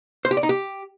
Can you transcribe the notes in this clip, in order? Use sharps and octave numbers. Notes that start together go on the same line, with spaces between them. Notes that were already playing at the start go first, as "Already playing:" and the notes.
C5
G4
D5
D#4
G4